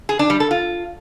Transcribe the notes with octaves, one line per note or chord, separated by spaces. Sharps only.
G#4
D4
G3
A4
F4